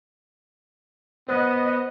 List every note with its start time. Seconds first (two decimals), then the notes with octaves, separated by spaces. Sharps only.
1.29 B3 C5 D#5 F#6